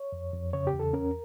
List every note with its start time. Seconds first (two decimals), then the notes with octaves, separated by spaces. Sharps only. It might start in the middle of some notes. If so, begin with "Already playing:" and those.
Already playing: C#5
0.12 F2
0.33 F2
0.53 C#3 C#5
0.67 G4
0.73 E2
0.79 A4
0.93 C#4 A#4